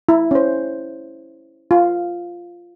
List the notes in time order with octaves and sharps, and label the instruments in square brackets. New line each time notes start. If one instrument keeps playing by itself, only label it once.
[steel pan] E4
C#4 C5
F4